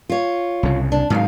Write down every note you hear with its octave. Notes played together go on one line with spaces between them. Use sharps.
F4 C#5
C2 C#3
D4
G#2 C3 D#3 F#3 F5